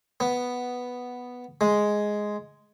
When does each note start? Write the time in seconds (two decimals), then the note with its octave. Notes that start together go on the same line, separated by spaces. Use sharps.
0.20 B3
1.61 G#3